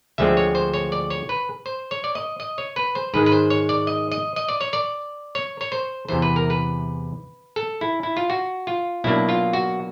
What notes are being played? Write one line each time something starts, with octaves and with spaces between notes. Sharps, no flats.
D2 D3 F3 G#3 C4 E5
C#5
C5
C#5
D5
C#5
B4
C5
C#5
D5
D#5
D#5
C#5
B4
C5
G#2 D#3 G#3 B4
B4
C5
C#5
D5
D#5
D#5
D#5
D5
C#5
D5
C#5
C#5
C5
E2 C3 E3 C5
B4
A#4
B4
A4
E4
E4
F4
F#4
F4
B2 F#3 A#3 D4 E4
F4
F#4